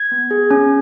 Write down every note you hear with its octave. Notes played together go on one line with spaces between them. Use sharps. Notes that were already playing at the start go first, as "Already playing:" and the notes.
Already playing: G#6
B3
G#4
C#4